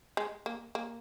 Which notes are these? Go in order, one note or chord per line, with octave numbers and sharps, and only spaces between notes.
G#3
A#3
A#3